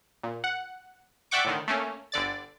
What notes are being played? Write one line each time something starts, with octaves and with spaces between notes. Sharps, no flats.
A#2
F#5
D5 E5 F#5 G5 C#6 D6
A2 D3 D#3
A3 A#3 C#4
G1 D3 D5 A6